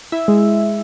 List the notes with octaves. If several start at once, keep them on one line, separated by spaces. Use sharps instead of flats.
E4 E5
G#3